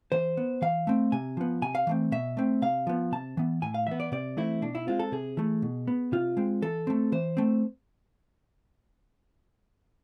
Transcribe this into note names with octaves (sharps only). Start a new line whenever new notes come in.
E3 C5
B3
E3 F5
A3 C4
C3 G#5
F3 B3
C3 G#5
F5
E3 A3 C4
B2 E5
A3 C4
C3 F5
F3 B3
C3 A5
E3 B3
A2 G#5
F5
E3 B3 E5
D5
C3 D5
E3 A3 C4 E4
B2 D4
E4
G#3 C4 F4
A4
C3 G#4
E3 A3
B2
B3
C3 F4
G#3 C4
E3 A4
A3 C4
E3 C5
A3 C4